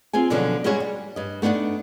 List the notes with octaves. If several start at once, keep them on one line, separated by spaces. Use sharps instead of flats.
C4 F4 G#4 G#5
B2 D3 F3 F#3 C#4
G3 G#3 C#4 F#4 G#4 C#5
G3
G2 D#5
A3 B3 D4 D#4 F#5